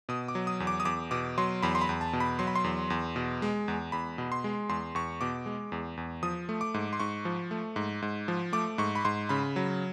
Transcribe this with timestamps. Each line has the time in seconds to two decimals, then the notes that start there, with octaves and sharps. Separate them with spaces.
0.09 B2 D#6
0.28 D6
0.35 F#3
0.47 D#6
0.60 E2
0.67 D6
0.80 D#6
0.85 E2 D6
1.11 B2 D6
1.38 F#3 C6
1.62 E2 B5
1.75 C6
1.81 B5
1.89 E2
2.01 A5
2.13 B2
2.20 B5
2.39 F#3 C6
2.47 B5
2.56 C6
2.64 E2
2.90 E2
3.16 B2
3.42 G#3
3.68 E2
3.92 E2 B5
4.18 B2
4.32 C6
4.44 G#3
4.69 E2 C6
4.95 E2 C#6
5.21 B2 D6
5.46 G#3
5.72 E2
5.97 E2
6.23 F3 D#6
6.49 A3
6.61 D6
6.74 G#2
6.93 C6
7.00 G#2 C#6
7.25 F3
7.51 A3
7.76 G#2
8.02 G#2
8.28 F3
8.53 A3 D6
8.78 G#2 C#6
8.95 B5
9.05 G#2 C6
9.29 C#3 B5
9.56 F#3